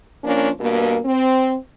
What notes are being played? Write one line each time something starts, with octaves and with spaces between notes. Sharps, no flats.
F3 A#3 C#4 D4
G2 B2 A#3
C4